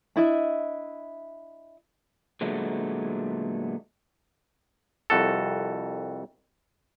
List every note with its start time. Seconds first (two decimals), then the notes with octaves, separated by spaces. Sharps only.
0.16 D4 E4 D#5 E5
2.41 A#2 D3 F#3 G#3 A3 B3
5.10 C2 F2 F#4 A4